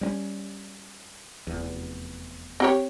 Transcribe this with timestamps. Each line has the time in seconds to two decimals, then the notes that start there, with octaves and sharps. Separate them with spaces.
0.01 G3 C4 C#4
1.47 F1 E2
2.60 C4 G4 C#5